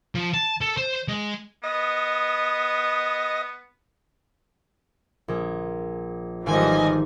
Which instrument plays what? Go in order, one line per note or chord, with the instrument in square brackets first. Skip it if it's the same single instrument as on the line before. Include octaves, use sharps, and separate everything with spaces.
[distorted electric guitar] F3
A5
A4
C5
G#3
[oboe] B3 [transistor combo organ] D#5
[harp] A#1 G#4
[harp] G#1 [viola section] E3 F3 G3 [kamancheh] D#5 G#5